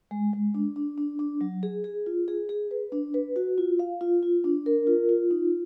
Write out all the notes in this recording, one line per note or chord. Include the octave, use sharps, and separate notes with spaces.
G#3
G#3
D4
D4
D4
D4
F#3
G#4
G#4
F4
G#4
G#4
B4
D4
B4
F#4
F4
F5
F4
F4
D4
A#4
F4
F4
D#4